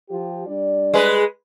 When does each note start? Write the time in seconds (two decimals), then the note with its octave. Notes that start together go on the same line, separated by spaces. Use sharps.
0.10 F3 F4 G4
0.47 G3 D4 D5
0.94 G#3 B4